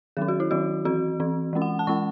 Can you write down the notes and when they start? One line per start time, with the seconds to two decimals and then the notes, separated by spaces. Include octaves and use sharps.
0.17 D#3 F#3 C#4 G#4
0.28 F#4
0.40 E4
0.51 D#3 F#3 C#4 F#4
0.85 E3 C4 F#4
1.20 E3 C4
1.53 E3 G#3 C#4
1.62 F#5
1.79 A5
1.87 E3 G#3 C#4 C#6